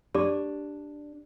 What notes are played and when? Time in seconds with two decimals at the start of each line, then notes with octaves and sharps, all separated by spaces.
0.15 D4 G4 D5 D6